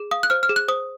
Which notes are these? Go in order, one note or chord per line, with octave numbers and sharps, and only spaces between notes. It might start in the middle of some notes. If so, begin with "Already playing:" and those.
Already playing: G#4
F5 D#6
F#6
C5 F6
F6
G#4
F#6
C5 D#6